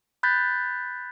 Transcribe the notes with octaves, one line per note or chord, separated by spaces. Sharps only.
B5 F#6 G6 A6 B6